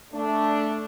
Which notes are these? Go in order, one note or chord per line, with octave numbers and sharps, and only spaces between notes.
A3 D4